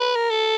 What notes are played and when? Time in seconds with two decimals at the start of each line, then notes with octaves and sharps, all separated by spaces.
0.01 B4
0.16 A#4
0.31 A4